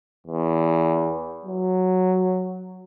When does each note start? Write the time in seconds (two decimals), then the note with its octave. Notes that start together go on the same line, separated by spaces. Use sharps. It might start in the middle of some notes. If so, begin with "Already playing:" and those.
0.27 E2
1.44 F#3